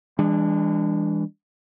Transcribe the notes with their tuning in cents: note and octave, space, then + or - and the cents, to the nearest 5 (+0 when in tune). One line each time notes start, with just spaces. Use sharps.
E3 +0 G#3 -40 D4 +0